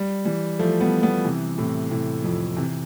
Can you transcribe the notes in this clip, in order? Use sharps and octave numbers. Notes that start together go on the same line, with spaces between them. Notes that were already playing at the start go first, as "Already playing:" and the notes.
Already playing: G3
E3 G3
F3 A3
G3 B3
G3 B3
C3 E3
A2 C3
A2 C3
F2
C3 E3